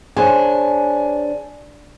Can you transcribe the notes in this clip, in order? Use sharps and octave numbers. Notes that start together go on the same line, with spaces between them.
D4 G#4 C5 C#5 G#5